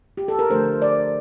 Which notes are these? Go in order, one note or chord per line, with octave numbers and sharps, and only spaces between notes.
G4
A4
A#4
D3 F3 A3 D4 C5
D5